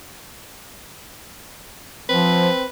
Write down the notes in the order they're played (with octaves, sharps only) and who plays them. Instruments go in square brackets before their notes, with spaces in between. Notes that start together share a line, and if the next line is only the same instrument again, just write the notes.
[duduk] F3 [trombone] C4 [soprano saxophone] B4